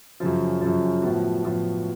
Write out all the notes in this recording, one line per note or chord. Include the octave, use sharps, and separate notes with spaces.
F#2 C#3 F3
F#2 C#3 F3
A2 F3 B3 F#4
A2 F3 B3 F#4